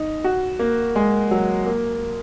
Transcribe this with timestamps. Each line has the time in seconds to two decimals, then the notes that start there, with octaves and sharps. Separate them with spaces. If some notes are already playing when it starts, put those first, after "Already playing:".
Already playing: D#4
0.24 F#4
0.59 A#3
0.96 G#3
1.31 F#3
1.66 A#3